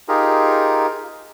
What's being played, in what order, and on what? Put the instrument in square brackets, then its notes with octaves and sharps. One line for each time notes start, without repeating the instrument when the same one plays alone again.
[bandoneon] D#4 F4 G4 G#4 A#4